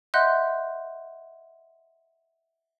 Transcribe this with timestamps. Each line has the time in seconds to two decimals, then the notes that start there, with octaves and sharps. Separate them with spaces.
0.14 D#5 E5 F#5 C6 F#6 G6